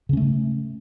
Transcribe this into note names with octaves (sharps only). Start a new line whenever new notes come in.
C#3 A3 C#4